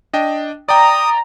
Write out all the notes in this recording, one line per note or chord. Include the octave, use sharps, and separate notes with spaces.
D4 D#5 G5
D5 G5 A#5 D#6